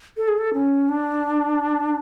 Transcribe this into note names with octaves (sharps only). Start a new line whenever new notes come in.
A4
G#4
A4
C#4
D4